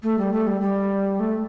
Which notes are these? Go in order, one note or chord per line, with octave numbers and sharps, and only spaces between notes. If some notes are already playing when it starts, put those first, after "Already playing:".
A3
G3
A3
G3
G3
A3